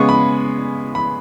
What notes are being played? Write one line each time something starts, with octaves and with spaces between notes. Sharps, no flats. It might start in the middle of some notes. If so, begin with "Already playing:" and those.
Already playing: C#3 G#3 B3 C#6
B5
B5